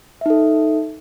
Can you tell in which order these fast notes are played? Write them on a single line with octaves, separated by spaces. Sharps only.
E5 D#4 A4